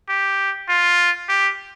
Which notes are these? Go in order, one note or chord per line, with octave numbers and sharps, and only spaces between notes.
G4
F4
G4